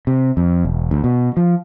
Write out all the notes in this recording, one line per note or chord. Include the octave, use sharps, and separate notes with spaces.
C3
F2
E1
D2
B2
F3